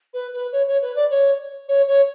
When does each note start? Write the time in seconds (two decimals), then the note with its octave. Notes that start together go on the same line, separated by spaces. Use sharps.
0.13 B4
0.33 B4
0.52 C#5
0.67 C#5
0.82 B4
0.95 D5
1.10 C#5
1.68 C#5
1.87 C#5